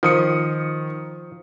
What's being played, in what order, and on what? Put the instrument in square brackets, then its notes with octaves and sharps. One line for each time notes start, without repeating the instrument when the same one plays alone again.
[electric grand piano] D#3 D#6 C#7 [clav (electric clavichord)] F3